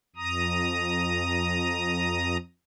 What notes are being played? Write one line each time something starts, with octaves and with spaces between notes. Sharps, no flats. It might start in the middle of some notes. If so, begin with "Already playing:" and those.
F2 A#5 D#6